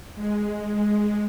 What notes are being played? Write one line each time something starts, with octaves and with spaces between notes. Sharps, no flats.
G#3